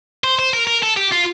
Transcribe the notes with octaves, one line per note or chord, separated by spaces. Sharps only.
C5
C5
A#4
A#4
A4
G4
F4